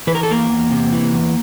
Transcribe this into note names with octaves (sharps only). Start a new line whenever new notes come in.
E3 B4
A#4
A4
E2 A#3 A#4
E2
C3
E3
E2